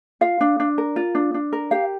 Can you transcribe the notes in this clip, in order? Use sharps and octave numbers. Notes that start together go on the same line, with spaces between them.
F4 F5
D4
D4
A#4
F4
D4
D4
A#4
G4 F5